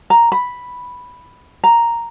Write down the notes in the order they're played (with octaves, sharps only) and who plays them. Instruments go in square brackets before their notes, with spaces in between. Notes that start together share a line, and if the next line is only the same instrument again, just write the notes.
[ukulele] A#5
B5
A#5